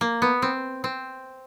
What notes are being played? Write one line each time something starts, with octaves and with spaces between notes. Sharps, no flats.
A#3
B3
C4
C4